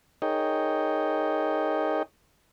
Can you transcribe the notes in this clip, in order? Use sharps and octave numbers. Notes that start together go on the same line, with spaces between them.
D#4 G#4 A#4 C#5 D#5 G5